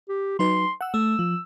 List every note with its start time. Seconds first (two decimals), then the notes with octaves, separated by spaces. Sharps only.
0.09 G4
0.39 F#3 D#4 B4 C6
0.81 F#5 E6
0.94 A3 A4 E6
1.19 F3